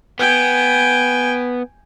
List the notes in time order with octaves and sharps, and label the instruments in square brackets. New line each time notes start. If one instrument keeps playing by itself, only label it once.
[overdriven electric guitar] B3 [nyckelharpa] G5 G#5